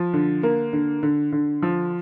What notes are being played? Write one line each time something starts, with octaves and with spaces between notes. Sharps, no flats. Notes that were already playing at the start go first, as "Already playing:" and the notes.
Already playing: F3
D3
A#3
D3
D3
D3
F3